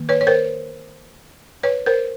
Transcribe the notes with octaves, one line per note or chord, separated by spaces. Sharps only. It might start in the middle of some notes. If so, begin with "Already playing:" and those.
Already playing: D#3 A#3
B4 C#5
C#5
A#4 C5
B4 C#5
A#4 C5